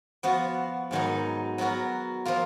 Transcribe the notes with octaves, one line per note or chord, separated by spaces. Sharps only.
F3 B3 F#4
G#2 D#3 F#3 B3 D#4
F#3 B3 F#4 A#4
F3 A#3 F4